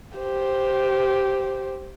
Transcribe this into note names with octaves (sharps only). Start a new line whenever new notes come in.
G4 C5